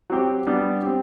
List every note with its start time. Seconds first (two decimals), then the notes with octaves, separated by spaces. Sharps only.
0.10 F#3 C4 G4
0.47 G3 B3 D4 G4
0.83 C4 G4